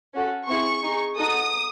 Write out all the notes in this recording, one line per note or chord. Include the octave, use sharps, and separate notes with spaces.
C#4 F#4 A4
C4 E4 G#4 C#6
D#4 G#4
D#4 F#4 A4 D#6